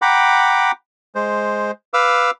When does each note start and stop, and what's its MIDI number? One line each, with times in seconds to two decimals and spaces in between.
0.02 0.71 78
0.02 0.71 79
0.02 0.71 82
0.02 0.71 83
0.02 0.71 86
1.15 1.71 56
1.15 1.71 72
1.94 2.31 71
1.94 2.31 77
1.94 2.31 86
1.94 2.31 88